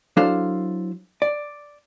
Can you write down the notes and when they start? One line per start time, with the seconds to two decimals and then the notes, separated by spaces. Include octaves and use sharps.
0.17 F#3 D4 E4 A4 C5 F5
1.22 D5